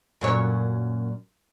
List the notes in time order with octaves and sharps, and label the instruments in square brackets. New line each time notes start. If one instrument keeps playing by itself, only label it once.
[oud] F#2 A#2 C#5